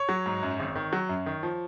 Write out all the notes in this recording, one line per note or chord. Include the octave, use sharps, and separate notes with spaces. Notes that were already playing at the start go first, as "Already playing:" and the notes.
Already playing: C#5
F#3
G#2
F#2
G#1
D#3
F#3
F#2
D#3
F3